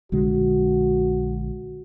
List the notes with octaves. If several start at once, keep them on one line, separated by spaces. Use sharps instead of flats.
A#1 D3 G#3 F#4